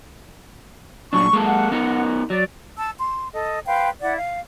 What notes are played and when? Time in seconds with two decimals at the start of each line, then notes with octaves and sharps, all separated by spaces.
1.13 A#2 F#3 D4 C#6
1.33 G#3 A#3 A4
1.46 F#5
1.72 B3 D#4 A#4
2.30 F#3 D5
2.77 A5 E6
2.97 C6
3.33 A4 D#5
3.65 B4 C5 F5 G5
4.01 E4 D5 F#5
4.16 F5